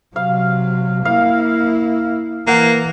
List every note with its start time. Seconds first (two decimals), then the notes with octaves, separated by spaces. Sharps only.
0.16 C3 F#3 F5
1.05 A#3 E4 F5
2.47 E3 A#3 F#5